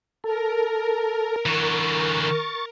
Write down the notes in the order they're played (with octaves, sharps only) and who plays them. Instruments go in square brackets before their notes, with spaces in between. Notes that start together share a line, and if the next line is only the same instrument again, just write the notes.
[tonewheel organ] A4 [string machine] A#4
[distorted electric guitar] D3 E3 [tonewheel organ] C#6 A6